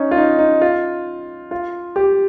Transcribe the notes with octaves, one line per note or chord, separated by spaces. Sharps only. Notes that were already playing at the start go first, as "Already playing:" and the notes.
Already playing: C#4 D#4
F4
D#4
D#4
F4
F4
G4